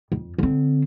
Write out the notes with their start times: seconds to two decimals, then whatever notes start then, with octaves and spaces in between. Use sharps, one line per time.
0.12 F2
0.38 D3 C4